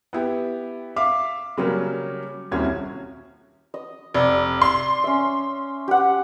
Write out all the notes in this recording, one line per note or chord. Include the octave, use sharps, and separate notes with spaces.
B3 E4 G4
E5 F5 D6
C#3 F#3 G3 A#3 C#4
D#1 C2 C3 C#4 F#4 G#6
D#5
F1 D5
C6
C#4 E5
G4 F#5